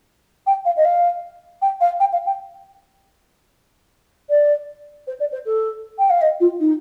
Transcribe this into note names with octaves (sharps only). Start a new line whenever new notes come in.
G5
F5
D#5
F5
G5
F5
G5
F5
G5
D5
C5
D5
C5
A4
G5
F5
D#5
F4
D#4